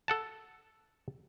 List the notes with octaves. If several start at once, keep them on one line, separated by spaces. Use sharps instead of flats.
A4 F#5 A5